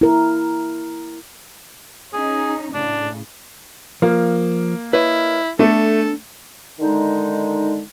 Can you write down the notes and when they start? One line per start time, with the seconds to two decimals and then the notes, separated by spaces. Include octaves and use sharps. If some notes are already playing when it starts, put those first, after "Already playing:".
0.01 E4 A#4
2.13 C#4 D#4 G#4
2.74 A2 C#3 D4
4.02 F3 A#3
4.93 E4 B4 C#5 D#5
5.59 A3 B3 D4 A4
6.80 D3 D#3 G#3 D#4